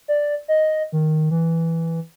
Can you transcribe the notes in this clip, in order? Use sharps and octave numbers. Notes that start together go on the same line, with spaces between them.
D5
D#5
D#3
E3